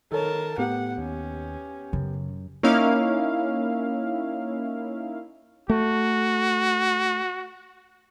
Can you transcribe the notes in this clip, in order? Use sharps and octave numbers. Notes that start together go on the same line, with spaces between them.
D#3 A4 A#4 C#5 A5
A2 B3 G4 F#5
D#2 C#4
F#2 C#3
A#3 C#4 D#4 E4 F5
A3 F#4